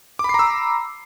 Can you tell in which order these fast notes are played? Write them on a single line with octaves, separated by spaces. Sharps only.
D6 B5 C7 A#5 E6